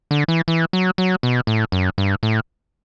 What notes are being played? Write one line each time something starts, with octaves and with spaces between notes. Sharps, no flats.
D3
E3
E3
F#3
F#3
B2
A2
F#2
G2
A2